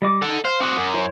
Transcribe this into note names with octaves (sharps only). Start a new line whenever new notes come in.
G3 D#5 D6
D#4 A4 F#5
C5 F5
C4 F#4 F#5 D6 D#6
F#2
E4 C5 C#5